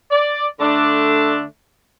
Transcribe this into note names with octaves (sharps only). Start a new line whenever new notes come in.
D5
D3 A3 D4